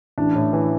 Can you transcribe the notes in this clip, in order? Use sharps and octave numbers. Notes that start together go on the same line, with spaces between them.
A1 D4
A2
E3